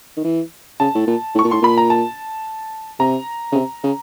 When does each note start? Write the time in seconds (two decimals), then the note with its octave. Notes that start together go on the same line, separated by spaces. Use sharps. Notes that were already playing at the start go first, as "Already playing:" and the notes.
0.17 D#3
0.24 E3
0.80 C#3 A5
0.95 A2
1.07 A#2
1.35 A2
1.39 C#6
1.44 A#2
1.51 A2 C6
1.62 A#2 B5
1.78 A#5
1.90 A5
3.00 C3 A#5
3.52 C#3
3.55 C3
3.83 C#3